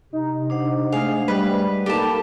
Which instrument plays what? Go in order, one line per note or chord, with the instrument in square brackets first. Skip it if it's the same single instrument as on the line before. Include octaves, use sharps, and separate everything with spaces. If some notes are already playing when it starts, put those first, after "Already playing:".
[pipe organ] C3 [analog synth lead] D#4
[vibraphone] D4 C5 F#5
[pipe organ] G#3 A3 [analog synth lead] G#4 [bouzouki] F5
[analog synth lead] G3 [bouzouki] B4
[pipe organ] A#3 D#4 [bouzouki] G4 A5 [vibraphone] A4 A#4 B5